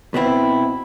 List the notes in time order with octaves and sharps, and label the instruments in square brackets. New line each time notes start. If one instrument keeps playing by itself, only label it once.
[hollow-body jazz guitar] B2 B3 C4 E4